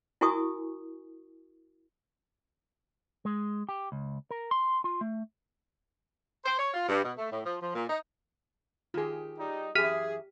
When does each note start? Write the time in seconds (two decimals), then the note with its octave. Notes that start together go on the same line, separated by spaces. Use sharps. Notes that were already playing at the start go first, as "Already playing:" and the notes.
0.21 E4 F#4 A#4 G#5 C#6 D#6
3.25 G#3
3.69 G4
3.92 C#2
4.31 A#4
4.51 C6
4.84 F4
5.01 A3
6.45 C5
6.59 C#5
6.74 F4
6.89 G2
7.03 B2
7.18 A3
7.32 A2
7.46 F3
7.62 F3
7.75 A#2
7.89 D#4
8.94 D#3 F4 G4 G#4
9.37 G3 D#4
9.75 F#2 E3 G4 G#4 E5 F6 B6 D#7